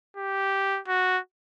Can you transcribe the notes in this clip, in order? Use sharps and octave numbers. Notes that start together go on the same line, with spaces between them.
G4
F#4